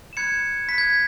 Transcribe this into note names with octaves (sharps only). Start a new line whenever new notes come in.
E7
B5 F#6 G#6 C#7
B5 F#6 B6
G#6